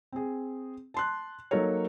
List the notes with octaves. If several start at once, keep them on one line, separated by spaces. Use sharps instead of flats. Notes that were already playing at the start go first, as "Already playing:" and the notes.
C4 G#4
A5 C6 F#6
F#3 A#3 D#4 A4 A#4 C#5